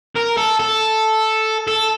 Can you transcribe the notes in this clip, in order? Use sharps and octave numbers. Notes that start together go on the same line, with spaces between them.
A#4
A4
A4
A4